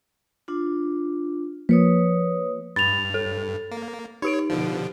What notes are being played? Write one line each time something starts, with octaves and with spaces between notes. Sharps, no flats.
D4 F4
F3 A#3 B4 C#5 D#6
G2 B5 A6 F7
A4
A#3
D#4 G4 C#5 D7
B2 D3 F3